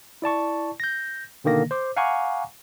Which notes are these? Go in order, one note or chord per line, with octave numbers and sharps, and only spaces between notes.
E4 D5 A5 C#6
G6 A#6
B2 D3 D#3 A#3 A#6
C5 D6
F5 F#5 G#5 A#5 C#6 D6